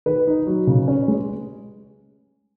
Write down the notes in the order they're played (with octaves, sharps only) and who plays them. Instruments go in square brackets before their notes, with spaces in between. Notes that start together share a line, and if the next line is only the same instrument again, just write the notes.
[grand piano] D#3 B4
D#4
F#3
C#3
C#4
G#3